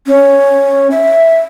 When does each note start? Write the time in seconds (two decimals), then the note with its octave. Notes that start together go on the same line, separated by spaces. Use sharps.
0.07 C#4
0.91 E5